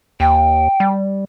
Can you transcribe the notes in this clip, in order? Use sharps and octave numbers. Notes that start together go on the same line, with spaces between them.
D#2 G5
G3